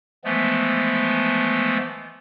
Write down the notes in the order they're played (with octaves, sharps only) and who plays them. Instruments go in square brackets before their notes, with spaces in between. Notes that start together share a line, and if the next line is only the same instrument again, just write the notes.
[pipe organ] E3 F3 G#3 A3 B3